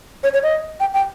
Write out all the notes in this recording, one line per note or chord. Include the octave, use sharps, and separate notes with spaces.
C#5
C#5
D#5
G5
G5